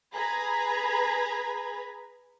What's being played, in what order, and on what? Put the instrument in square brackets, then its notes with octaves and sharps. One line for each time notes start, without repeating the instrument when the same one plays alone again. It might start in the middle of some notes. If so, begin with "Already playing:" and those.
[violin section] G#4 B4 A#5 B5 G#6